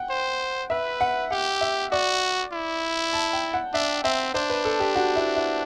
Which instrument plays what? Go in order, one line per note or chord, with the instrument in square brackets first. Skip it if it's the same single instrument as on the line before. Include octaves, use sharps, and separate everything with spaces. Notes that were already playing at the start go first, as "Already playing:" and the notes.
Already playing: [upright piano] F#5 G5
[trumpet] C5
[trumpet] B4 [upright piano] E5
[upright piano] F#5
[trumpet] G4 [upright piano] F#5
[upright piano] E5
[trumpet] F#4 [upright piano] D5
[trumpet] E4
[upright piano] A5
G5
F#5
[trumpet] D4 [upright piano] E5
[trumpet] C4 [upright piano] E5
[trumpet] D4 [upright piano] C5
[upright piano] B4
A4
G4
F#4
E4
E4